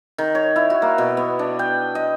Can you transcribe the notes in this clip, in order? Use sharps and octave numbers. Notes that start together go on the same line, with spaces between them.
D#3
C#5
E4
F#4
A#3
B2
B3
D4
G5
D#5